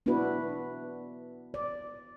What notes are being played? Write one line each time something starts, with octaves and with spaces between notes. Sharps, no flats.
B3 D4 E4 F#4 B4
D5